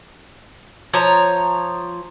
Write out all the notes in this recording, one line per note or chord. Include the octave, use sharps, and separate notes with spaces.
F3 C#5 A#5